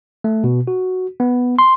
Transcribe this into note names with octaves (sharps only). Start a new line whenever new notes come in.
A3
B2
F#4
B3
C6